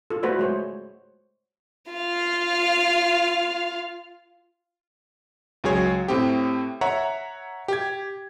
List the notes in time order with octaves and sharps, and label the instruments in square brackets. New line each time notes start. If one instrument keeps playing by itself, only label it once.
[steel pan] F4 A4
A3 F4 F#4 B4 C5 D5
G#3 C5 C#5
[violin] F4 F5
[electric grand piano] C#2 F#3 G#4 C#5 G#6
A2 C4 G4
C#5 E5 F#5 A#5
G4 G#6